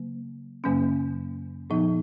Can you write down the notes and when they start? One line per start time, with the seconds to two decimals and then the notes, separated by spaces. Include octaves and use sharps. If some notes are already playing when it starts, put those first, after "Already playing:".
Already playing: C#3 F#3 A#3
0.64 F#2 C#3 F#3 A#3 C#4
1.70 A#2 F3 B3 D#4